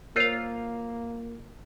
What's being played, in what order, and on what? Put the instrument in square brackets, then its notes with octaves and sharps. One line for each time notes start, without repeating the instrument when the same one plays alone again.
[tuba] A#3 [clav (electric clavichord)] F4 F5 [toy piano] A#4 C5 C#5